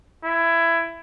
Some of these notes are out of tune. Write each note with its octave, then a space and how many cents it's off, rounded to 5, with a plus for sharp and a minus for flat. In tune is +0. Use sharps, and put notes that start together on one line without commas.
E4 +20